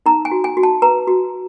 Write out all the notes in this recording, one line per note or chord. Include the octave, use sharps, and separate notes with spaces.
D#4 A#5
G#5
F#4
G#5
F#4
A5
B4 A#5
F#4